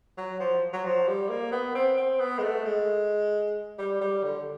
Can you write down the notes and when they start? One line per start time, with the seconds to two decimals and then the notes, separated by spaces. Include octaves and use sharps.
0.17 F#3
0.40 F3
0.73 F#3
0.84 F3
1.07 G3
1.29 A#3
1.52 B3
1.74 C4
1.97 C4
2.19 B3
2.38 G#3
2.43 A3
2.65 G#3
3.78 G3
4.01 G3
4.23 D3